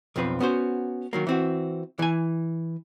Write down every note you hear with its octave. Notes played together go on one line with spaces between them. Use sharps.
B1 F2 F3 C4 B4
B3 C#4 F#4 C5
D#3 F#3 A#3
E3 C4 F#4
E3 G#5